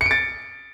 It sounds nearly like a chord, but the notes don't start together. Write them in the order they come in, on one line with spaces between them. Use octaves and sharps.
C#7 D7 A6